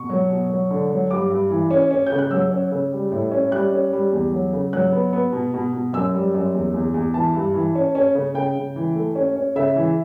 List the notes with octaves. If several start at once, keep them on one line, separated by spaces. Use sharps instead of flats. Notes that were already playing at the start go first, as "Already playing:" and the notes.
Already playing: B2 C#6
F#3
B2
F#3
D3
F#3
G2 D6
G2
E3
C#4
C#4
G6
C#3
F#6
F#3 E6
C#4
C#3
G3
A2
C#4
G3 F#6
C#4
G3
E2
F#3
C#3
F#3 F#6
B3
B3
B2
B2
B2
F#2 E6
G3
F#2
E2
E2
E2
E3 A5
G2
E3
C#4
C#4
C#3
C#3 G5
C#3
E3
A3
C#4
C#4
C#3 E5
E3